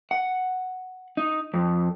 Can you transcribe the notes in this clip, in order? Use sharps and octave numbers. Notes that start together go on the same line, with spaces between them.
F#5
D#4
F2